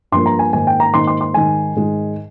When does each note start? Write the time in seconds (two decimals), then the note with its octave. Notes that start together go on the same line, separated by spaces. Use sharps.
0.12 G2 F3 A#3 C6
0.26 A#5
0.39 G#5
0.53 G#2 D#3 A#3 G#5
0.67 G5
0.80 A#5
0.94 G#2 D#3 A#3 C6
1.07 C6
1.21 C6
1.34 G#2 D#3 G#3 G#5
1.76 G#2 D#3 G#3